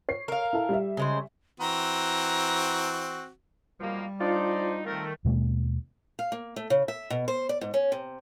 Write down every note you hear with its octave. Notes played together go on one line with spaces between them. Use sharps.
C#5 C7
A#4 F5
E4 A4
G3 E5
C#3 G#3 C5
E3 C4 F#4 A#5
B2 F3 G3 A#3
D4 D#4 F4 C5 D5
D#3 A3 C4 F4 A#4
D#2 B2 G#3 A#3
F5
A#3
A3
C#3
E5
B2
C5
D5
G#2
C#4
C3